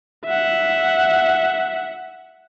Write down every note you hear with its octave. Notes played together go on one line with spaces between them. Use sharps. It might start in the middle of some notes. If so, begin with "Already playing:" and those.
E5 F#5